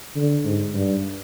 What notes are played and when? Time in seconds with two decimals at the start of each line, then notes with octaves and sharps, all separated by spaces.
0.16 D3
0.44 G#2
0.74 G2